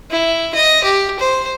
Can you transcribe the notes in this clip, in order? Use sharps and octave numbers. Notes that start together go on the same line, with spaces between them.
E4
D#5
G4
C5